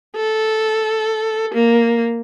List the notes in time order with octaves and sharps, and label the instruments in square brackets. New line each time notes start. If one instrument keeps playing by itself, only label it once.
[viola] A4
A#3